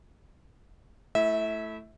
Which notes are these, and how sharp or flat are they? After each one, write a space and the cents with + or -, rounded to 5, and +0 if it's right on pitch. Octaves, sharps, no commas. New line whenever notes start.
A3 +0 E4 +10 E5 -25